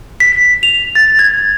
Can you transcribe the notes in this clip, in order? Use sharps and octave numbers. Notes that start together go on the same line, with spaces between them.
B6
F7
A6
G#6